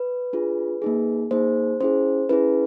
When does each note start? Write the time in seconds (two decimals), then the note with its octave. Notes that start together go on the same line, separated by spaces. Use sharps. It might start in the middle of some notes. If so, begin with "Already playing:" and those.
Already playing: B4
0.33 D4 F4 G#4
0.82 A#3 D#4 G#4
1.31 A#3 D#4 G#4 C5
1.81 C#4 E4 G#4 C5
2.29 C#4 E4 G#4 B4